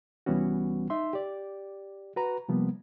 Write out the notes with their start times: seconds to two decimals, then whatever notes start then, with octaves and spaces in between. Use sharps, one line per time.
0.26 C2 E3 G3 B3 C#4 F#4
0.90 D#4 E5 C6
1.13 G4 D5
2.16 F#4 B4 A#5
2.48 C3 F3 G3 A#3 B3